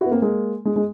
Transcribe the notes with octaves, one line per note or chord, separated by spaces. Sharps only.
E4 F#4
B3
A#3 C4
G#3 A#3
G#3
G#3